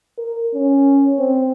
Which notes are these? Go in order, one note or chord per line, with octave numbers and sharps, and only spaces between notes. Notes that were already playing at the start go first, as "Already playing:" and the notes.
A#4
C#4
C4